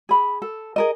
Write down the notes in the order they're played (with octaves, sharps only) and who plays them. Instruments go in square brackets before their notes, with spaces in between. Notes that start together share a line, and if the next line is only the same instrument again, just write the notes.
[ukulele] G#4 B5
A4
G#4 A#4 D#5